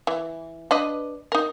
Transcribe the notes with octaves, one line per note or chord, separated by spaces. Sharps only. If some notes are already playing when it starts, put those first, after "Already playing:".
E3
D4 B4 D#5
D#4 A#4